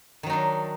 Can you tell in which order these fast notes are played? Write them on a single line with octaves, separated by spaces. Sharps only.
D#3 F#3 D#4 D4